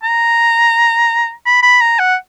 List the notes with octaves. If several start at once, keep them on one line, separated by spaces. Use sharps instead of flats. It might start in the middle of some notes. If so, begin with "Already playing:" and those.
A#5
B5
B5
A#5
F#5